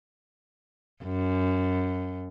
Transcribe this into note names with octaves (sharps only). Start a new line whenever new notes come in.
F#2